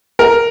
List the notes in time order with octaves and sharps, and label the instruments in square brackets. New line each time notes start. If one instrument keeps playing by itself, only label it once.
[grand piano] A#4